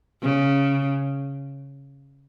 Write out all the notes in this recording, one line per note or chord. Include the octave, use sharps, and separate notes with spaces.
C#3